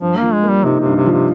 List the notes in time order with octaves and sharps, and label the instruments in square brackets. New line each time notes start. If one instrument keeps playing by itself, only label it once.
[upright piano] G2 [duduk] F3
[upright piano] F3 [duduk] A#3
[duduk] G#3
[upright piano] A#3
[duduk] G3
[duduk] C3 [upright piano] D#4
[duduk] C3
[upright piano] G2
[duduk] C3
[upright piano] F3
[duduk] C3